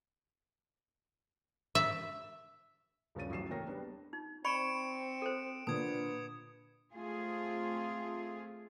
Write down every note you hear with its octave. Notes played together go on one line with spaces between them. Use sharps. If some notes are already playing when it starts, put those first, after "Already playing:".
E5
D#1 G2 C#3 C#5 A6 D#7
A1 F#3 C7 E7
A3 A#3 C#5 G5 A#6
G3 B3 D4
D#4
C4 D5 B5 C#6 C#7 D7 E7
A4 C5
A#2 D3 B4 D#6 G#6
A3 C4 F4 G#4